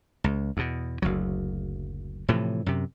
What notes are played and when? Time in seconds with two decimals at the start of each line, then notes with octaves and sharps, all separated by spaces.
0.24 C#2
0.57 E2 B2
1.02 F#1 D2 F#3
2.28 A2 C3 E3 F3
2.66 F#2 C3